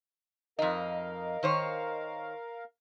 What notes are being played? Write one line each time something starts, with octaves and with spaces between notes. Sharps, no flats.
F2 D#4 A#4 D#5 F5
D#3 C5 C#5